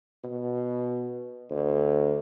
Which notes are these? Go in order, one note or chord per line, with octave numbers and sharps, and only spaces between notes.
B2
D2